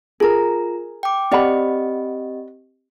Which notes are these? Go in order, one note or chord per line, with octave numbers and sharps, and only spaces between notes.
F4 G#4 A#4 A#5
G5 D6
C4 G4 D5 D#5 F#5 B5